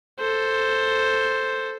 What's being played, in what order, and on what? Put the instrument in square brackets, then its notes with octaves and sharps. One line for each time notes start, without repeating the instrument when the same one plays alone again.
[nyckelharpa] A4 C5